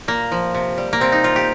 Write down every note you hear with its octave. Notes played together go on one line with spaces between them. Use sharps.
A#2 A#3
F3
C3
G3
A#3
C3 C4
D#4
C3 F4
G4